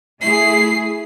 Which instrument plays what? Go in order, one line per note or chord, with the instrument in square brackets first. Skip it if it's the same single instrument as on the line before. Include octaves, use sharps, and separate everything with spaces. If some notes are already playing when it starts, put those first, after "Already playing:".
[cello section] A3 E4 G#4 [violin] C7